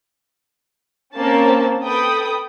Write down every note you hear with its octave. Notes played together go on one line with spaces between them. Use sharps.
A#3 C4 C#4 A5
A4 B4 G5 D#6